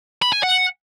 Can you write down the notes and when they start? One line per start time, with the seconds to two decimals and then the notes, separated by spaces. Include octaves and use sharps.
0.22 B5
0.33 G#5
0.43 F#5